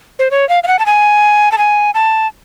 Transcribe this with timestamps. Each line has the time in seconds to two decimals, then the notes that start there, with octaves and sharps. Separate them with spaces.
0.19 C5
0.31 C#5
0.49 F5
0.63 F5
0.67 F#5
0.79 A5
0.86 G#5
1.52 A5
1.58 G#5
1.94 A5